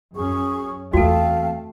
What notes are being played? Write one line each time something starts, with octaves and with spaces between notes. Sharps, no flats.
F#2 C#4 G#4 C#6
E2 A3 C4 F#4 A4 F5 G5 A5